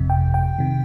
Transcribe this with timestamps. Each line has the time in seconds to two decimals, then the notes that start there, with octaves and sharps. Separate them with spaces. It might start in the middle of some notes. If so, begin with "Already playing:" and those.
Already playing: G1 F2 C3
0.10 G5
0.34 G5
0.58 C3 D#3